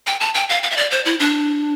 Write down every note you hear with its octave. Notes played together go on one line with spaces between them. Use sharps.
G5
A5
G5
F5
F5
E5
D5
C5
E4
D4